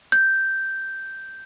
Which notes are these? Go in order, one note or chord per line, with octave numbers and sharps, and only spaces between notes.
G6